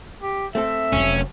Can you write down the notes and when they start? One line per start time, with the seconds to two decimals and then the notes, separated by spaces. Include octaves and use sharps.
0.22 G4
0.55 A3 C4 A4 E5
0.92 F1 F#3 C#4